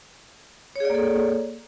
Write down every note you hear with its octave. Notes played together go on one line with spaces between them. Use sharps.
A#3 G#4 A4 C#5 D5